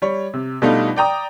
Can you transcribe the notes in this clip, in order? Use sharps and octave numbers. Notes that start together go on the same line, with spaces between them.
G3 C#5
C3
B2 G3 A3 D4 D#4 F4
D5 G5 A#5 D#6